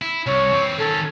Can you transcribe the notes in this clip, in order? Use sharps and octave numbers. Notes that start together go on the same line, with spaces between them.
E4
C2 C#5
E3 C4
D#3 C#4 A4